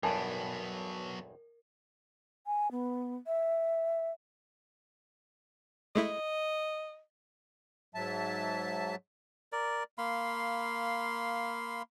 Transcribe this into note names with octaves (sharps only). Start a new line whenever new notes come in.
B1 E2 G2 F#3 B3 A#4 G#5 A5
G#5
B3
E5
G#3 A3 E4 D#5
G#2 F#3 E5 A5
A#4 D5
A#3 F5 B5 C6